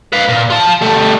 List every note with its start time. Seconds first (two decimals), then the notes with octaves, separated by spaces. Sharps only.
0.12 B4 F5
0.28 A#2
0.50 F4 A5
0.81 G3 A3